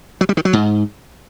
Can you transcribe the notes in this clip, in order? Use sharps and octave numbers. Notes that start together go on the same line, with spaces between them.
F#3
G3
D#3
F#3
G#2